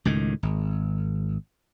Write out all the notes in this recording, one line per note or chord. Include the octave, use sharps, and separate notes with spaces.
C#2 A2 D#3
G#1